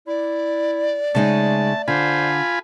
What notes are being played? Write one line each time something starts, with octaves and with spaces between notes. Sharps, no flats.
E4 D5
C#3 G#3 A3 D#4 A5
D3 F4 C5 G#5 B5